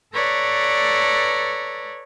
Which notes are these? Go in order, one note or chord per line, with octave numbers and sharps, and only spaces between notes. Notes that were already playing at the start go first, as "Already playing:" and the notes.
A4 B4 C#5 D5 A#5